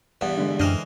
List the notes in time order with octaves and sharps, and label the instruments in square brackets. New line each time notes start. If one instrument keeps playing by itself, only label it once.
[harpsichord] E2 G2 B3
[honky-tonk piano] D3 G#3
[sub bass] F#2 [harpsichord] E3 C5 D#5 [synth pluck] D4 G5 F6